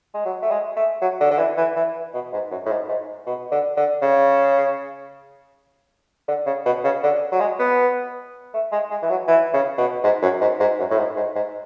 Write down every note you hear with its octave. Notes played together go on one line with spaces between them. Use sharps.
G#3
F#3
A3
G#3
A3
F#3
D3
D3
E3
E3
E3
B2
G#2
F#2
A2
G#2
G#2
B2
D3
D3
C#3
D3
C#3
B2
C#3
D3
F#3
G#3
B3
A3
G#3
G#3
E3
F#3
E3
C#3
B2
G#2
F#2
G#2
G#2
F#2
A2
G#2
G#2
G#2